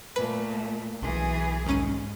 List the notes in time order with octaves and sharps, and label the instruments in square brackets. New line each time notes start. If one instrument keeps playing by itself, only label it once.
[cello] A#2 A3 [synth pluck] B4
[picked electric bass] B1 [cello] E3 G#4
[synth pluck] D#2 C#4 D#7 [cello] G#2